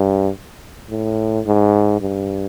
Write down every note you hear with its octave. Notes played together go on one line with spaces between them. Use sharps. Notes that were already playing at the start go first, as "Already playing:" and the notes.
Already playing: G2
A2
G#2
G2